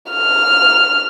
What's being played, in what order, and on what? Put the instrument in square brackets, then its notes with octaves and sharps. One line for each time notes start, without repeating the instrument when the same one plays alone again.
[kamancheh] F6